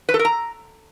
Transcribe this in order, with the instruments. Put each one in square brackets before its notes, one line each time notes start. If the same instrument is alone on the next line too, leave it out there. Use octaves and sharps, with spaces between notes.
[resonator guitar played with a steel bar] B4
A4
A#4
A#5